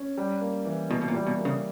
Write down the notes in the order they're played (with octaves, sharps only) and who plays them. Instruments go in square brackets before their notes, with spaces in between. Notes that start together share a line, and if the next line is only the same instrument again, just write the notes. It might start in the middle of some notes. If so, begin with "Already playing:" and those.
Already playing: [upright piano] C#4
G3
A#3
E3
[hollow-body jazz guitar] B2 [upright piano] E4
[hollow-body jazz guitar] B2
A#2
[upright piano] G3
[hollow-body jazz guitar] B2
[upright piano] A#3
[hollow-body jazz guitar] C#3